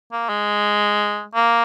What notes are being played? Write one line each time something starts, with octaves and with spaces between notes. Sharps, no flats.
A#3
G#3
A#3